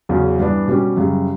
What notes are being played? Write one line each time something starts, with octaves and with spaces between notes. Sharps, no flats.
E2 C#3 F#3 C#4
G2 E3 B3 D4
B2 G3 C#4 G4
F#2 C#3 G3